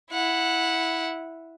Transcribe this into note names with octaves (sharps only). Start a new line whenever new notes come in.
E4 F#5